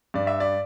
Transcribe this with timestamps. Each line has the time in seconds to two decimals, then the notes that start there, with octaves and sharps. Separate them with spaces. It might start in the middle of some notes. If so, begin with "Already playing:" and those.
0.14 G2 D5
0.27 E5
0.40 D5